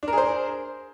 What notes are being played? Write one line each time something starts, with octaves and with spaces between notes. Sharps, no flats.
D4 G#4 A#4 C5